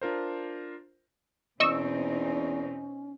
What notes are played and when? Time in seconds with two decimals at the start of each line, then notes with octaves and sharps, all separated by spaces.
0.02 D4 F4 A#4 C5
1.60 E2 B2 C4 C#4 D#4 D#5 C#6 E6